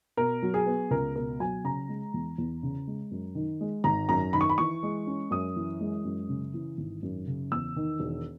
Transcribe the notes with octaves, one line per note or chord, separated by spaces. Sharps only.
B2 A#4
F#3
G#4
B3
C#2 A#4
B2 A#4
F#3 G#5
C#3 A#5
G#3
E2
E2
C#3
G#3
F#2
D#3
G#3
G#1 A#5
F#2 A#5
D#3 B5
C#6
B5
E3 C#6
G#3
C#4
F#2 D#6
E3
G#3
F#2
C#3
E3
G#1
F#2
C#3
E2 E6
D#3
E1